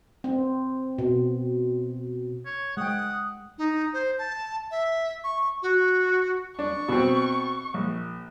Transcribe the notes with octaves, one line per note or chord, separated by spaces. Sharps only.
C4
B2
C#5
G#3 F#5 G5 D#6
D#4
C5
A5
E5
C#6
F#4
D4 C#6
B2 C4
A#1